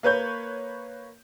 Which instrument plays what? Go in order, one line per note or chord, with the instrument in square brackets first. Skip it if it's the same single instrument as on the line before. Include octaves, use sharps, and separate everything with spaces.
[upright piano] A#3 B4 C#5 G6